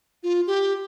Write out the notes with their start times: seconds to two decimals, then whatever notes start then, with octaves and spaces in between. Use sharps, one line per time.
0.23 F4
0.47 G4